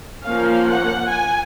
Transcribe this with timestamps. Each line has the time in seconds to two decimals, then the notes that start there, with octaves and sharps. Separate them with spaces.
0.25 F3 A#3 C#4 F5
0.68 F#5
1.10 G#5